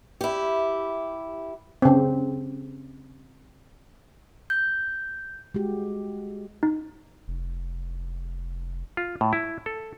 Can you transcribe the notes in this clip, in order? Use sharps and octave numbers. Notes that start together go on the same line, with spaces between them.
E4 G4
C#3 C4
G6
G#3 F#4 G4
D#4
F1
F4
A2
E4
A4